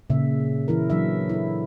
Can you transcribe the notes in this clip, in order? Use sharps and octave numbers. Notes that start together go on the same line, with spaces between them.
A#2 C#3 E5
E3 E4 A#4
E3 F#3 D4 E5
E4 A4